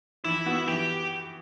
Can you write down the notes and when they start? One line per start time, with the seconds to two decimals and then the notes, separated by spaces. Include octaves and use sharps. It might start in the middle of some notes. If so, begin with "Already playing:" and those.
0.24 E3 E4
0.46 B3 F#4
0.68 E3 G4